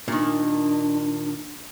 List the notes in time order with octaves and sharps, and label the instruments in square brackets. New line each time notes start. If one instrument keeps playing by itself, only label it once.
[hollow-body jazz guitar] A#2 D#3 [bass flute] D4